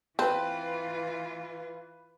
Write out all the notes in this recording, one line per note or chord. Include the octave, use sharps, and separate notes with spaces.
E3 C4 F4 B4